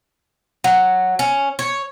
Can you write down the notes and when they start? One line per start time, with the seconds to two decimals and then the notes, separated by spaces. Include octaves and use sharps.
0.64 F#3
1.19 C#4
1.59 C#5